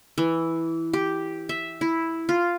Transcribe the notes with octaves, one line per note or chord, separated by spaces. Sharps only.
E3
G4
E5
E4
F4